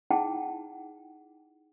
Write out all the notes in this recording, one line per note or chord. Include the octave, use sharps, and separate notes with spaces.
D#4 E4 G#4 F#5 G5 A5